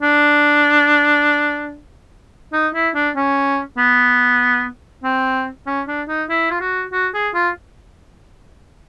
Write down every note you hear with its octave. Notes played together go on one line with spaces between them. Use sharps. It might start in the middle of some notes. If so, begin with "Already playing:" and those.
D4
D#4
E4
D4
C#4
B3
C4
C#4
D4
D#4
E4
F4
F#4
F#4
G#4
F4